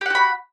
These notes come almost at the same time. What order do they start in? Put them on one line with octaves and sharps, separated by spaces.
G4 F#5 F#4 B5